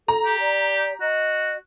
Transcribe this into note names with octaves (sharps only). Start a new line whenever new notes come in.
A4 A#5
G4
D5
F#4 D#5